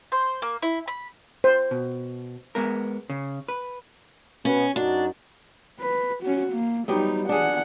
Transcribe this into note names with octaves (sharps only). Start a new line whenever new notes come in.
C5
A#3
E4
B5
C5
B2
G#3 B3 A#4
C#3
B4
B2 B3 C#4
F#2 D4 D#4 F#4
B4
C#4 F#4
A#3
F#3 G3 B3 D#4 G4
D4 G#4 F#5